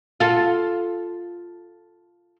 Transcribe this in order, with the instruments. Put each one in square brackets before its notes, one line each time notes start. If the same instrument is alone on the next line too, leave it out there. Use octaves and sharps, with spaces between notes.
[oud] F4 A4